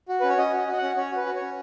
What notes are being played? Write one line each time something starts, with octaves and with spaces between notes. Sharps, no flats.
F#4
C#4 B4
C#5
C#4 D#5
F#4 D#5
F#4 D#5
C#4 F#5
C#4 C#5
F#4 B4
F#4
C#5
C#4